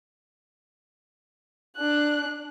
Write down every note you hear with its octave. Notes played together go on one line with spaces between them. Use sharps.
D4 F#6